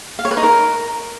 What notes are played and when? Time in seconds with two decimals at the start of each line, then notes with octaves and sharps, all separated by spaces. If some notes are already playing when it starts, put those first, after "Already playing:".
0.19 F5
0.25 C#5
0.31 B4
0.37 D#4
0.43 A#4